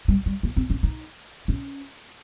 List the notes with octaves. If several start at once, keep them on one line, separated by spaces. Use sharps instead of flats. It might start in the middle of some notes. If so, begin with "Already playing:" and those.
G3
G3
A#3
C4
C#4
D#4
C#4